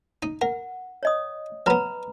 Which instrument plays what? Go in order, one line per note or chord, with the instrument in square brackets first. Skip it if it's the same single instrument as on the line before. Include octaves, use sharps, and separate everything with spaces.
[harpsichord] D#4
[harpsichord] A#4 [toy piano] F#5
[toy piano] C#5 D#5 D#6
[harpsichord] F#3 B3 [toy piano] B4 A#5 B5